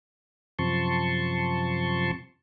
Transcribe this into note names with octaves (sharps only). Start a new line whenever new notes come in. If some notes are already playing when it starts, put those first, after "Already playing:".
F#2 C3 F3 A5 C6 C#6